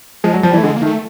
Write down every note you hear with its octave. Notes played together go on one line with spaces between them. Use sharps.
F3 G#3
F#3
F3 G3
E3
A3
D3 G#3
A#3
D#3 A3